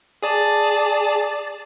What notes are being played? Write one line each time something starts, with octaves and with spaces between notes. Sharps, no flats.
G#4 D5 A5